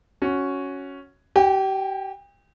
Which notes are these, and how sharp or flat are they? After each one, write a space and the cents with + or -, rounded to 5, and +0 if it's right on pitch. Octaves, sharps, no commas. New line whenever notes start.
C#4 +0 F#4 +0
G4 -30 G5 +35